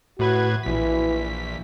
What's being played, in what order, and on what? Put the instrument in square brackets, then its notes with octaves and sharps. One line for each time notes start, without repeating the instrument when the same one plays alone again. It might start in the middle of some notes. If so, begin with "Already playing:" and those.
[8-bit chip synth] A2 B4 G#6 [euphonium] F#4
[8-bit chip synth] A#1 B6 [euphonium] E3